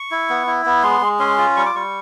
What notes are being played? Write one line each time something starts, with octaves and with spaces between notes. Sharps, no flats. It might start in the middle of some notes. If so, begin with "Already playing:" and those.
Already playing: C#6
E4
B3
E4
B3
G#3 C6
G#3
C#4 C6
F4
G3 C#6
D6
G3 C#6